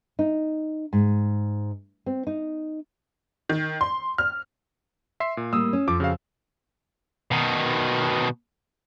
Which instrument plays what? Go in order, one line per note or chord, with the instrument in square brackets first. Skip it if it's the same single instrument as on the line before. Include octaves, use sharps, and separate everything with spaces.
[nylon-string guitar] D#4
G#2
C4
D#4
[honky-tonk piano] D#3
C6
F6
[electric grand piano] E5 C6 C7
A#2
[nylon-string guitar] A2 G3 A#3 [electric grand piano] D#6 E6
[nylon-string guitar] C#4
[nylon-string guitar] F2 [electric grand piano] F3 D6
[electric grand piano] C#3 F#4 F5
[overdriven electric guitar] B2 D#3